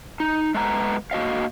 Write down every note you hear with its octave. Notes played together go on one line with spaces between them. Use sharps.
D#4
G#3 A3 B3 B4 A#5
A#3 F#4 D#5 F5